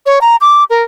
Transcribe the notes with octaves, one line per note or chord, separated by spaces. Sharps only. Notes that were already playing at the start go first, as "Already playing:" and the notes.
C#5
A#5
D6
A#4